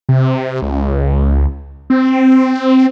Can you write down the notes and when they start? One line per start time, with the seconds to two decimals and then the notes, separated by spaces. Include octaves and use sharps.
0.09 C3
0.62 C#2
1.90 C4